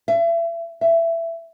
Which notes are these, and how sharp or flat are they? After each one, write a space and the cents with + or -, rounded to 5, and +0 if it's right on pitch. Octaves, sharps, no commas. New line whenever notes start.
E5 +35
E5 +15